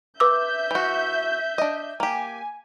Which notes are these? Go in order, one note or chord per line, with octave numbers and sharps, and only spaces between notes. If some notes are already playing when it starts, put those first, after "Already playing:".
B4 E5 D6 E6 G6
E3 F#4
D4 D#5
A#3 G4 G#5